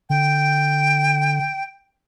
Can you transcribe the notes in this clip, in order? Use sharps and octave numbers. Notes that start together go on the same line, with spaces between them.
D3 G5